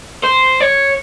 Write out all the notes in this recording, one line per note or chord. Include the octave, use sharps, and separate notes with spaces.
C5
C#5